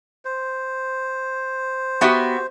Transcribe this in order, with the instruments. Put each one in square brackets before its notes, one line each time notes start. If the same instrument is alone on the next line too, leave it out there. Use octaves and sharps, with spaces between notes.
[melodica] C5
[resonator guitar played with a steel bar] B3 F#4 G4 [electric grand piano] E5 C#6